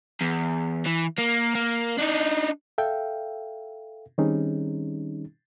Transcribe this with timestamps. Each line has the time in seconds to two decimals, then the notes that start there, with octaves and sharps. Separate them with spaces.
0.21 E2
0.86 E3
1.19 A#3
1.55 A#3
1.99 D4 D#4
2.78 A4 E5 F5 G5
4.18 D#3 G3 C4 C#4 D#4 G#4